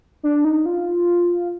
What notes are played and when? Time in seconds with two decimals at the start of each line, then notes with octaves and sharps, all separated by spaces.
0.23 D4
0.45 D#4
0.66 F4